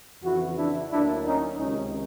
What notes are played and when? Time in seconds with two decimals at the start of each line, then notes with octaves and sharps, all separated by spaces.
0.23 F2 C#3 E3 E4 F#4
0.57 D4 E4
0.90 D2 D3 F#3 A#3 D4 E4
1.25 C#4 D#4
1.58 C#2 C3 D#3 C#4 D#4